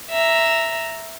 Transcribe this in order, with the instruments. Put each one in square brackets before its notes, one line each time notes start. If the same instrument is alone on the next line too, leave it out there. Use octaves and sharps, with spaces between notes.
[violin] E5 A#5